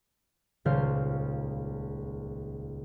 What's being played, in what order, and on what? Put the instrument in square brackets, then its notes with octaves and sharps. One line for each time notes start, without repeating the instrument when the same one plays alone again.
[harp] D#1 C#2 C#3 C5 F5 F6